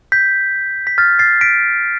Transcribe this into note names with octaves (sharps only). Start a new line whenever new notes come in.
G6 B6
B6
F6 A6
A6 C7
B6 D7